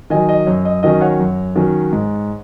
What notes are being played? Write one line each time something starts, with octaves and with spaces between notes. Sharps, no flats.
D#3 F#3 D#5 G#5
D#5
F#2 C#5
D#5
D#3 F#3 C#4 D#5
C#5 F#5
F#2
D#3 F#3 C#4
G#2